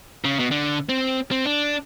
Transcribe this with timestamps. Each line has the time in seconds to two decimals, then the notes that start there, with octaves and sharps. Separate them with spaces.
0.24 C#3
0.39 B2
0.51 D3
0.89 C4
1.31 C4
1.45 D4